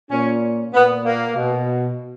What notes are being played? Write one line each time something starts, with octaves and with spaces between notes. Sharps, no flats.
A#2 C#4
A#2 B3
A#3
B2